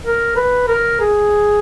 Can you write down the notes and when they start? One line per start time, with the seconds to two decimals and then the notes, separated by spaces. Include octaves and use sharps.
0.06 A#4
0.36 B4
0.68 A#4
1.00 G#4